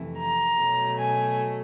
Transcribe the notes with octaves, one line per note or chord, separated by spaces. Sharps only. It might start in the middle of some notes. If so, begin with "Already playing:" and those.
Already playing: F2 C3 E3 A3
A#5
B2 F#3 A3
G#5